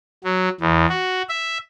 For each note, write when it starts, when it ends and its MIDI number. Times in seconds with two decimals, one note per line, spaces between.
0.24 0.49 54
0.61 0.86 40
0.89 1.22 66
1.29 1.58 76